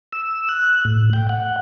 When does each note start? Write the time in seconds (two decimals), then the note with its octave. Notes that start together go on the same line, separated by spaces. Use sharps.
0.12 E6
0.49 F#6
0.85 A2
1.13 G5
1.29 F#5